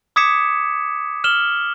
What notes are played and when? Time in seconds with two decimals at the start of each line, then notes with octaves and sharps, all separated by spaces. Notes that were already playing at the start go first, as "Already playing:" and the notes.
0.16 D6 D#6 G#6 B6 C#7 E7
1.24 F6 E7 F#7 G7